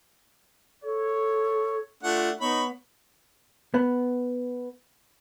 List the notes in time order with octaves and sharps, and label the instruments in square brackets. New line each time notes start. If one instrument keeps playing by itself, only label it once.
[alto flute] A4 [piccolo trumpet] C#5
[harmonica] A3 D4 F#5 [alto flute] F4
[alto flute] B3 [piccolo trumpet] D#4 [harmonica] C#5 B5
[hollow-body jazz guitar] B3